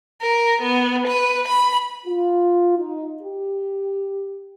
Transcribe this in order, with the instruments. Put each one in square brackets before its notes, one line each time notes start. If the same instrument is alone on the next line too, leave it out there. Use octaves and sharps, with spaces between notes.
[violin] A#4
B3
B4
B5
[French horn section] F4
D#4
G4